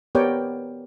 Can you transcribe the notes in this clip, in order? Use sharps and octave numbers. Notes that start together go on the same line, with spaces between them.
B3 G4 A#4 C#5 D5 G5